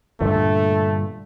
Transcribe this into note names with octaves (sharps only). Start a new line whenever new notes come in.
G2 A#2 D3 A3